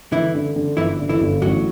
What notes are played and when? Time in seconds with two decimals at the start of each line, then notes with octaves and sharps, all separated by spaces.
0.12 D3 E3 E4
0.35 D3
0.56 D3
0.77 G1 E3 E4
0.99 D3
1.09 E3 E4
1.21 G1
1.42 A1 F#3 F#4